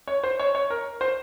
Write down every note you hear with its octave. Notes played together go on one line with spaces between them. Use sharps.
C#5
C5
C#5
C#5
A#4
C5